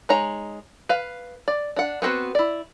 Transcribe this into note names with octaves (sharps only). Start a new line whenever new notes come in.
G#3 D#4 C#5 A#5
B4 F5
D5
D4 F#5
B3 C4 F#4 B4
E4 D5